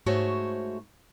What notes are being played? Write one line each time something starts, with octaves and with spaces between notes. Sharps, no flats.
G#2 A3 F#4 C5 C#5